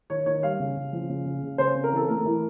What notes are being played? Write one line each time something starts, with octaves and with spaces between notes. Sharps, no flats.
D#3 C#5
D#3 C#5
G3 F5
C#3
C#3
F3
C#3
C#3
C#3
C#3 C5
C4
A#4
E3 A4
A3 A#4
E3